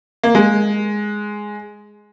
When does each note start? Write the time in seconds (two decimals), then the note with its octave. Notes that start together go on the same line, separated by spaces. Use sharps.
0.24 A#3
0.35 G#3